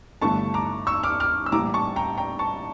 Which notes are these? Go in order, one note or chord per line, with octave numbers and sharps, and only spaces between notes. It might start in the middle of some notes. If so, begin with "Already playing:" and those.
G1 G2 E3 A3 A5 C#6
A#5 D6
C#6 E6
D6 F6
D6 F6
E6
A#1 A2 E3 G3 A#5 D6
A5 C#6
G5 A#5
G5 A#5
A5 C#6